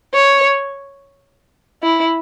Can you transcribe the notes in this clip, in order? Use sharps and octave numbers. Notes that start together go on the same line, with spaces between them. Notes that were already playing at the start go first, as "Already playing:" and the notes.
C#5
E4